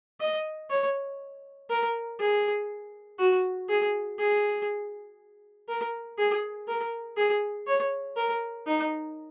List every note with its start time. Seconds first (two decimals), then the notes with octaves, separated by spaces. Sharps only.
0.20 D#5
0.70 C#5
1.70 A#4
2.20 G#4
3.19 F#4
3.69 G#4
4.19 G#4
5.68 A#4
6.18 G#4
6.68 A#4
7.17 G#4
7.67 C#5
8.17 A#4
8.67 D#4